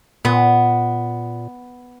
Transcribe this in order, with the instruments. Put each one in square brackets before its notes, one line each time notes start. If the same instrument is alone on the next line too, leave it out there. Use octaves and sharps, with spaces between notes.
[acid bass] A#2 [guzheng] B3